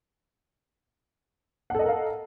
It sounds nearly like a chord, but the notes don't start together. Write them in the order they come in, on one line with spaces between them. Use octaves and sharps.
F#5 A4 D#5 A#4 F5